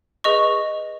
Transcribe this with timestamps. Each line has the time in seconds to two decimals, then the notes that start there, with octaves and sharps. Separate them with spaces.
0.24 G#4 B4 D#5 C#6